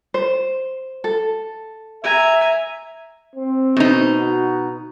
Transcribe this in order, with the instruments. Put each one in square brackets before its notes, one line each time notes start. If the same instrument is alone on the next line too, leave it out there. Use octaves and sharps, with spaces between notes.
[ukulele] C5
A4
[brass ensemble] E5 [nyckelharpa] G#5 A#5
[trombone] C4
[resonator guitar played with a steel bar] B2 D#4
[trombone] F#4